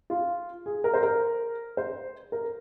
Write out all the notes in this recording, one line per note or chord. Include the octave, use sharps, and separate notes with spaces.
F4
G#4
A#4
C5
A#4
C5
A#4